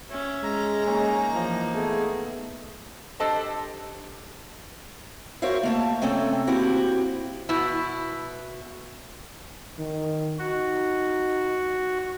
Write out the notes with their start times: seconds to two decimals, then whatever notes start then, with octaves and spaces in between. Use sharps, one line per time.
0.10 C#4 E5
0.43 G#3 A#5
0.86 A#3 C#4 D#4
1.33 E3 F3
1.74 A3 B3 G#4
3.20 D4 G4 A4 C5 D#5 A5
5.42 F#4 A#4 C5 C#5 E5 F5
5.63 A3 A#3 A5
6.02 C3 A3 C4 C#4 A4
6.47 A#3 C4 E4 F#4 G4
7.49 B2 E4
9.79 D#3
10.38 D#4 F#4